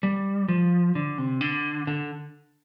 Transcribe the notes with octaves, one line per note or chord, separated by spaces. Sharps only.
G3
F3
D3
C3
D3
D3